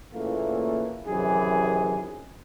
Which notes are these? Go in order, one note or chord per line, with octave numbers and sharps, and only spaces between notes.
A#2 C#3 E3 A3 A#3
F#2 C3 D#3 E3 G#4